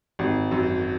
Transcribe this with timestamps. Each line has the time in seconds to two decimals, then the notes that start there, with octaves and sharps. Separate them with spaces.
0.19 G#1
0.51 F#2